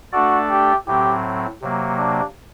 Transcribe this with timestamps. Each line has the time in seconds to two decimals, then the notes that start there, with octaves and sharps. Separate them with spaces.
0.12 A3 D4 F#4 A4 D5
0.50 G4
0.87 A2 F#3 C4 G4
1.62 C3 F#3 A#3
1.98 D4